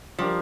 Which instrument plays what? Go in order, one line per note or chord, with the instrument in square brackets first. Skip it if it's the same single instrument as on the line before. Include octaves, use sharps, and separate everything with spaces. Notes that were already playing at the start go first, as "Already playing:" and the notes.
[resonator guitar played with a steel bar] F3 [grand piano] G3 D4 G4 A#4